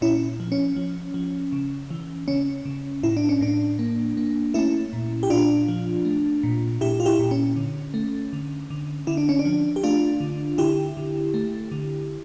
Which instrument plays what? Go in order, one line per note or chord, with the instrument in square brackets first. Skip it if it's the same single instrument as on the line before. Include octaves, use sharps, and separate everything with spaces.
[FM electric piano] A#2 C#4 E4
F3
C#4
F3
F3
C#3
E3
C#3 C#4
C#3
A2 E4
D4
C#4
A2 D4
A#3
A#3
A3 C#4 E4
A#2
G4
A#2 D4 F4
F3
A3
A#2
A#2 E4 G4
F4
E4 G4
A#2
C#4
D3
A3
D3
D3
D3 E4
D4
C#4
D4
F3
G4
A3 D4 F4
D3
D3 E4 G4
D3
A3
D3